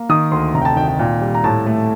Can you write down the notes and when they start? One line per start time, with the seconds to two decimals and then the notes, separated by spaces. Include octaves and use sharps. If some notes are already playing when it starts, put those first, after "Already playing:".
Already playing: A#3
0.09 D#3 D#6
0.32 D2 C6
0.54 F1 A#5
0.62 G5
0.65 A5
0.76 D#3 G5
0.88 G5
0.99 A#2
1.21 G3
1.34 A#5
1.44 A2 A5
1.66 A3